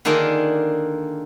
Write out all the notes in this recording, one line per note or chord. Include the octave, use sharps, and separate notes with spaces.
D3 D#3 A#3 D4 F4 G#4